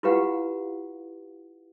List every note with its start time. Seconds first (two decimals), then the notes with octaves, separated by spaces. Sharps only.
0.03 E4 F4 G4 B4 F5 F#5